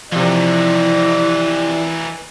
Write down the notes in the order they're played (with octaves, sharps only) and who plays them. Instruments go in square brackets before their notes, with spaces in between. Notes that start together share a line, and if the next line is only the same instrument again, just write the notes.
[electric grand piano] C3 F3 [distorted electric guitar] E3 D#4 [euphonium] E4 [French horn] D5